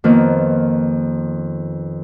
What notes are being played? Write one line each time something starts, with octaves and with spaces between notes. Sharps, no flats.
F2 D#3 A#3 B3